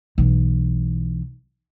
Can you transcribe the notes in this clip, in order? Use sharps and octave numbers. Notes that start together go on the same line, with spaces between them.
B1 E3